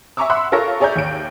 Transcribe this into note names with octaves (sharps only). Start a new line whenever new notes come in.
E5 G#5 A#5 C#6 D6 E6
E5 F#5 B5 C6 E6 F#6
F4 A4 A#4 C#5 C#6 A#6
G#4 C#5 D5 E5 A#5 G6
D#2 D7